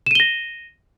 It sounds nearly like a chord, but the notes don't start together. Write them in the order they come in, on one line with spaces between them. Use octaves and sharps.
E7 D#7 G7 A#6